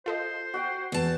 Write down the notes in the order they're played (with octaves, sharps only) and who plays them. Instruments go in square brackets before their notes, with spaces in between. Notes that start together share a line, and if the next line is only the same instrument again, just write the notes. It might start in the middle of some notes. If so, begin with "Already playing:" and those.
[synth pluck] F4 A4 D#5 [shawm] C5
[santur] F#4 F#5 G5
[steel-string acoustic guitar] E2 A5